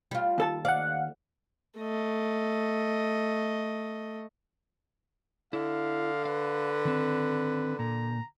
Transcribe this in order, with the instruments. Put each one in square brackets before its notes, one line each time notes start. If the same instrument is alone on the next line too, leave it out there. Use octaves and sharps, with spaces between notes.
[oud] G3 F4
[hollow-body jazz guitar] D#2 A4 A5
[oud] D5 [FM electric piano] F5 F#5
[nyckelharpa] A3 D#5
[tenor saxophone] D3 [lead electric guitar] E4 [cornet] F5
[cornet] B4 [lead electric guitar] F5
[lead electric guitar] D#3 C4
[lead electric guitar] A#2 [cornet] A#5